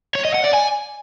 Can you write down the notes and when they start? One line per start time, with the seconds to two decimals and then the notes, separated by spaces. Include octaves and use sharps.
0.15 C#5
0.25 D#5
0.34 F#5
0.44 D5
0.53 G#5